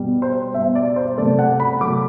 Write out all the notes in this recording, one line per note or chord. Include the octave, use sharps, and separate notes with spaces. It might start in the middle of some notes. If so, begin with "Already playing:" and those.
Already playing: B2 G3
C5
B2 G3 E5
D5
C5
C3 F#3 A3 D5
F#5
B5
C3 F#3 A3 D6